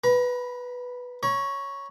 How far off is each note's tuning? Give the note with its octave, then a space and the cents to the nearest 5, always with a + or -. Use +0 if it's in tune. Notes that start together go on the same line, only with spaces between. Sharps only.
B4 +0 A#5 +35
C#5 +0 A#5 +45